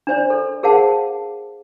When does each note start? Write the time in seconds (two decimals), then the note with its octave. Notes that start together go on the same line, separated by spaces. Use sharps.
0.07 D4 C5 D5
0.30 A4
0.63 G#4 A#4 C5 F5 F#5 A5